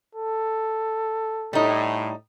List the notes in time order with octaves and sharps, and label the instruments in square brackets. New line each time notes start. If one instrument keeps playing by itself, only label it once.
[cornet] A4
[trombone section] A2 [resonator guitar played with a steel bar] G3 D#4